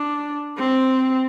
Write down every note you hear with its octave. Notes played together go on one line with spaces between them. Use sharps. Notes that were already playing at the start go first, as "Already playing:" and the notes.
Already playing: D4
C4